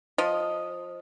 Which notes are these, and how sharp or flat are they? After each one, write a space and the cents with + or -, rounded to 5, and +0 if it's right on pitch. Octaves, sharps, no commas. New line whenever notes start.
F3 +15 D#5 +0